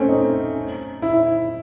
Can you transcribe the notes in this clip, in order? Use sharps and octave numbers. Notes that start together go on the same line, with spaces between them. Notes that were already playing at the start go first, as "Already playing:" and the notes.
Already playing: A3 C4 C#4
D#4
E4